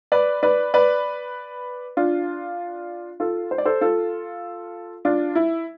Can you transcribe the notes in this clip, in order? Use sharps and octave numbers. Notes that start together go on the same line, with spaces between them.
B4 D5
B4 D5
B4 D5
D4 F4
F4 A4
C5
D5
A4 C5
F4 A4
D4 F4
E4